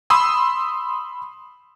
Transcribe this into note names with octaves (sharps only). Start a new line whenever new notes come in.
B5 C6 D#6 E6